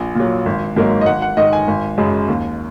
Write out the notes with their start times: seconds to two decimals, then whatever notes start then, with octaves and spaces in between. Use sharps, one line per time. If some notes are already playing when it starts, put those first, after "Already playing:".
Already playing: A#1 G#5
0.15 A#2 F#3
0.46 G#1
0.76 G#2 F#3 A#3
1.01 D#5
1.06 G#1 F#5
1.22 F#5
1.37 G#2 D#3 D#5
1.53 G#5
1.68 G#1
1.98 F#2 C#3 G#3
2.28 D#2